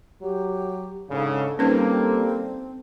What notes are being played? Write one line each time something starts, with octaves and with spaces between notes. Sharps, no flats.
F#3 G4
G#2 C#3 D4 A4
G3 A#3 C4 C#4 D#4 A4 B4